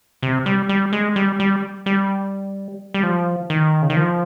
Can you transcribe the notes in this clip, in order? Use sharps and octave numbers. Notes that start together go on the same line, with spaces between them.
C3
G3
G3
G#3
G3
G3
G3
G3
F3
D#3
C#3
D#3
F3